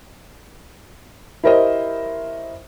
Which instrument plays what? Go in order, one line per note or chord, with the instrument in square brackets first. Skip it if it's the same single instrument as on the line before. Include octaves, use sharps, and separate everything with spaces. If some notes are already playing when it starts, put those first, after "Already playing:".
[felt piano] E4 G4 A#4 C5 C#5 D#5